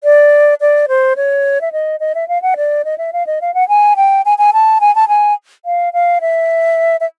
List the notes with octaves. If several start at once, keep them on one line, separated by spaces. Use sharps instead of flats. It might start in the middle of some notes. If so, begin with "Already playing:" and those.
D5
D5
C5
C#5
E5
D#5
D#5
E5
F5
F#5
D5
D#5
E5
F5
D#5
F5
F#5
G#5
G5
G#5
G#5
A5
G#5
A5
G#5
F5
F5
E5
E5